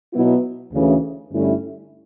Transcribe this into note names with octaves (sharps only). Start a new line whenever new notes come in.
B2 F#3 B3 E4
D2 C#3 E3
G2 D3 A3 C#4 E4